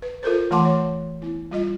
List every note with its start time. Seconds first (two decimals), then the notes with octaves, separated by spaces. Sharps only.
0.02 B4
0.23 F4 A4 A#4 C5
0.51 E3 A3 F#5 A5 C6 D6
0.65 C#5
1.22 B3 E4
1.51 G3 F4 D#5